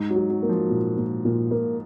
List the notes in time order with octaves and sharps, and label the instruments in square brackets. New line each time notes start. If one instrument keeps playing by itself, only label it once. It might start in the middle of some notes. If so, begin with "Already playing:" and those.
Already playing: [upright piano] G#2
F#3
[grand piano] F#4
[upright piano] F#3
[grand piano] A#3
[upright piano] F3
[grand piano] A#2
A#2
A#2
A#3